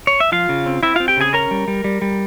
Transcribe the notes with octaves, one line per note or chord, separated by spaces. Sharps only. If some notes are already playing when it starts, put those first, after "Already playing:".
C#5
E5
F3 F4 F5
C#3
C4
C4 E4 E5
C4 F4 F5
G4 G5
C#3 G#4 G#5
C#4 A#4 A#5
G3
G3
G3
G3